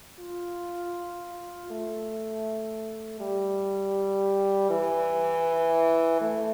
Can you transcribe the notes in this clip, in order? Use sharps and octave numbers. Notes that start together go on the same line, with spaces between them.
F4
A3
G3
E3
A3